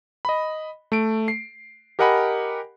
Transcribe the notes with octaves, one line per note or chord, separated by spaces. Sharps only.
D#5 B5
A3 D7
C7
G4 A#4 D#5 F#5 G#5 B5